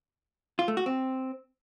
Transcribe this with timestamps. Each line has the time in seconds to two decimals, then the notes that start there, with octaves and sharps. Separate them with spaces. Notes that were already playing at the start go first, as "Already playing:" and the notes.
0.59 F4
0.68 A3
0.77 F#4
0.86 C4